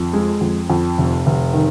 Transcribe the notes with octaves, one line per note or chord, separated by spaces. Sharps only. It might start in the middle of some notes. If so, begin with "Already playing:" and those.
Already playing: F2
G#3
F2
F2
F1
F1
D#3